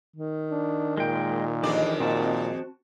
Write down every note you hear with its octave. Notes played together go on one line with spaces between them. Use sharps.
D#3
D4
A#2 G#3 G5
F2 E3 G#3 D4 G4 D5
A#2 C4 F#4 A5